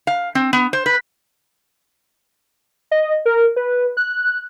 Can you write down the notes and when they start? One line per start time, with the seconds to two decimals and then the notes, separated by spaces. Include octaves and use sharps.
0.07 F5
0.35 C4
0.53 B3
0.73 C5
0.86 B4
2.91 D#5
3.26 A#4
3.56 B4
3.97 F#6